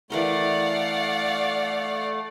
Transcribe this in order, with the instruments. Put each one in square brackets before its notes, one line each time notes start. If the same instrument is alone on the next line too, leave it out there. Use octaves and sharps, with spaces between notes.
[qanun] E3 A#4 C6 [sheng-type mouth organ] A3 [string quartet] D5 F5 F#5